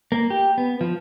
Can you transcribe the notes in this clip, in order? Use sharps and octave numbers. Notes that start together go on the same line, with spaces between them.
A#3
G4
B3
F3